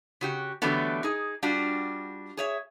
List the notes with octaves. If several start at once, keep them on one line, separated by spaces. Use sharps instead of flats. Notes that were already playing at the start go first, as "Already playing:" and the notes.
C#3 F#4 G4
D3 E3 F#3 G3 A3 B3
D#4 G#4
G3 D4 F4 F#4
G#4 C#5 E5